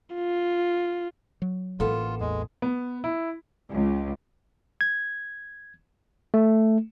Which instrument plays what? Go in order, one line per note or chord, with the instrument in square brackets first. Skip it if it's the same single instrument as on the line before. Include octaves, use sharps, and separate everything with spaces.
[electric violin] F4
[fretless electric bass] F#3
[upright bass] A1 [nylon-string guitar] A#3 B3 A4 [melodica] F4
[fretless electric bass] E2 [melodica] G#3
[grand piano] B3
E4
[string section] C#2
[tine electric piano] G#6
A3